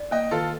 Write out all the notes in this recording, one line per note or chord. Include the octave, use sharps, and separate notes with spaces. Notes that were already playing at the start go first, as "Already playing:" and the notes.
Already playing: D5
A#3 D#5 G5
D#3 F4 A4